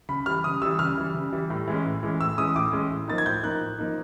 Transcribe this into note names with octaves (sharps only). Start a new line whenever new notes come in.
C#3 B5
E3 G3 F6
C#3 D#6
E3 G3 E6
C#3 F6
E3 G3
C#3
E3 G3
A2
E3 G#3 C#4
A2
E3 G#3 C#4
A2 E6
E3 G#3 C#4 D#6
A2 D6
E3 G#3 C#4
A2
F3 A#3 D#4 A6
G#6
A2 G6
F3 A#3 D#4 F#6
A2
F3 A#3 D#4